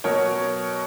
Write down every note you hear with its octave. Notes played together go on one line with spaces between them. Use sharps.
B2 F#3 A#4 C#5